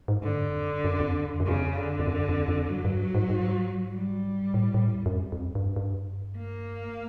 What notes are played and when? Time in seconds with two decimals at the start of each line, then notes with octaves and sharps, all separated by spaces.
0.08 G#2
0.23 G2 D3
0.44 F2
0.64 F#2
0.84 F#2
1.00 F2
1.15 E2
1.30 F2
1.40 F#2
1.46 F2 C#3
1.77 D3
1.99 F2
2.07 F#2
2.29 F2
2.48 F2
2.69 G2 F#3
2.85 G2
3.00 G#2
3.15 G#2
3.30 G#2
3.92 G3
4.54 A2
4.74 A2
4.94 E2
5.06 F#2
5.15 F2
5.32 F2
5.44 F#2
5.55 G2
5.76 G2
6.38 A#3